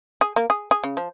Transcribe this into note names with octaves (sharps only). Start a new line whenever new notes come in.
G#4
A#3
G#4
G#4
C#3
F3